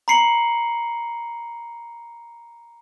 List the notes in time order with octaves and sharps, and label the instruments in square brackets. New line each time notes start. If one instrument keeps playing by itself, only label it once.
[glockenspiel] A#5 B5 C7 C#7 F#7